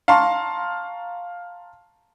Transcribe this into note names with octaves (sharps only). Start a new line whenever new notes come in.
F5 A5 A#5 C6 C#6